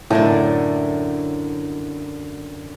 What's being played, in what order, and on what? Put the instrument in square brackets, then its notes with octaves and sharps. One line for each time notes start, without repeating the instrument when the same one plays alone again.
[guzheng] F#2 D3 D4 [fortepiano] A2